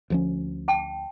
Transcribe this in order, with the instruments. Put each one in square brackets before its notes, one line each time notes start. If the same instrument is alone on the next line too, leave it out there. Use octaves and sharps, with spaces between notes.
[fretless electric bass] D2 F3 C#4
[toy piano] G5 A5